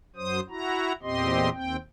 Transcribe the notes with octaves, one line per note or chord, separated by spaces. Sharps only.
F#2 F#3 C5 D#6
E4 F#4 A#5
E2 A#2 C4 G4 D#5 C6
D#2 C4 G5